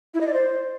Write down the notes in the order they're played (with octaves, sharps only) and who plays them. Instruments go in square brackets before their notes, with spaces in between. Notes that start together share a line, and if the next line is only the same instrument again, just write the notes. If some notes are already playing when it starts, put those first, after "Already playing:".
[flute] E4
D#5
D5
C5